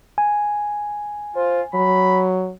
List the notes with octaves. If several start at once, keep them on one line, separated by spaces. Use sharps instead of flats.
G#5
F4 C5
F#3 B5